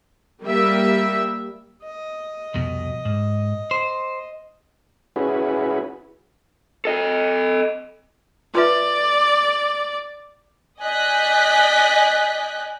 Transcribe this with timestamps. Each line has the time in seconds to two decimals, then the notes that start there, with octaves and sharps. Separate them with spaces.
0.44 G3 A#3 E5
1.83 D#5
2.54 C2 F2 B2
3.05 G#2
3.71 C5
5.16 C#4 E4 F#4 G#4 B4
6.85 A4 D#5
8.55 F4 B4 D5 E5
10.81 D5 D#5 G#5 F#6 G6 B6